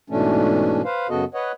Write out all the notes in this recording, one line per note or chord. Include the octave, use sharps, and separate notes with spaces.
G#2 B2 E3 A3 C#4 D4
B4 C5 F5
F#2 C#3 B3 F#4 A4 D#5
B4 C#5 D#5 F#5